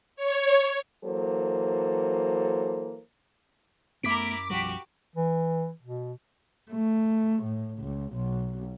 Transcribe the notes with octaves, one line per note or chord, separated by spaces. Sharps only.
C#5
E3 F#3 A#3 A4 C5
F#2 A3 B3 E4 A#4 D6 B6 D7
B1 F3 G3 F#4 G4
E3
B2
A3
A2
C#2
B1